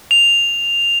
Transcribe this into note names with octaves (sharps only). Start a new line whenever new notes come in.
F7